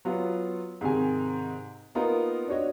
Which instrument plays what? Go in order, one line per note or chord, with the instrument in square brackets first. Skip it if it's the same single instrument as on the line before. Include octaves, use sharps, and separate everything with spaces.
[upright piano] F#3 B3 F4
G#2 C3 D#3 G#5
A#3 B3 D#4 F4 A#4
D4 F#4 C#5 D#5